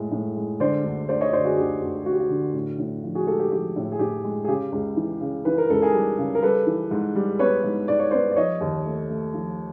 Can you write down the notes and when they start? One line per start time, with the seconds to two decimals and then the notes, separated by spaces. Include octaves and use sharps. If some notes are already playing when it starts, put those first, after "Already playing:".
Already playing: A2 G#3
0.12 A2
0.36 G#3
0.60 D3 C5 D5
0.84 D2
1.09 D2 C5 D5
1.21 C#5 D#5
1.33 D2 C5 D5
1.45 F#4 G#4
1.57 D2 G4
1.82 D2
2.06 D2 F#4
2.13 G4
2.20 F#4
2.30 D3
2.54 A2
2.79 A2
3.03 F3
3.15 F#4 G#4
3.27 G#3 G4 A4
3.39 G4
3.52 F3 G4
3.76 A2
3.92 G#4
3.99 A2 G4
4.24 G#3
4.44 G#4
4.48 C#3 G4
4.72 C#2
4.96 E3
5.21 C#3
5.45 E3 B4
5.58 A#4
5.70 C#2 A4
5.82 G#4 A#4
5.94 G3
6.18 C#3
6.35 A#4
6.43 G3 A4 B4
6.66 E3
6.91 G#2
7.15 G3
7.39 B3 B4 C#5
7.64 G#2
7.88 G#2 D5
7.99 C#5
8.11 B3 C5 D5
8.31 D5
8.36 F3 C#5 D#5
8.61 D#2
8.85 A3
9.09 A3
9.34 F3